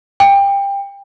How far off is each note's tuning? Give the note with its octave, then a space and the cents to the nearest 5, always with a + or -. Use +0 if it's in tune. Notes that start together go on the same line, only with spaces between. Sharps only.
G5 +25